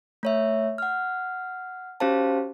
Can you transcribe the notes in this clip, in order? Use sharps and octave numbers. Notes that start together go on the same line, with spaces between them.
A3 C#5 E5
F#5 F6
C#4 F#4 G4 C5 F5 A5